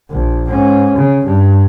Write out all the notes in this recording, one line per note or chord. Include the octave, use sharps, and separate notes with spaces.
A#1
G#2 C#4
C#3
G2